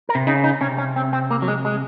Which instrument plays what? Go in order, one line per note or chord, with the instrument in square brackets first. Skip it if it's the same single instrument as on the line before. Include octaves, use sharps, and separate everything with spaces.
[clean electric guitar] A#4
[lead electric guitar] C3
[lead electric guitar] C#3 [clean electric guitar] D#4
[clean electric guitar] D#4
[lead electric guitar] C3 [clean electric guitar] C#4
[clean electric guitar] C#4
C4
C4
A#3
F#3
G#3
G#3